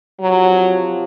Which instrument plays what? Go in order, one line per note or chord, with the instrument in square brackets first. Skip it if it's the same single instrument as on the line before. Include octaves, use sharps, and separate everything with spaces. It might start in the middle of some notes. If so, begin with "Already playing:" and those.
[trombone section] C3 F3 C4 [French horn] F#3